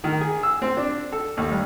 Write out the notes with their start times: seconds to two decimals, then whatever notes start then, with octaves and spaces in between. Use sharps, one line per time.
0.04 D#3
0.21 G#4
0.43 E6
0.62 C4
0.77 D4
1.12 A4
1.37 D#2
1.51 G2